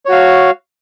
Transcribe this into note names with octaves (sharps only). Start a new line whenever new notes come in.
F#4 C#5 F5